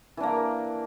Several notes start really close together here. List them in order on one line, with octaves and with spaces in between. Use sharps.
E3 D4 A#3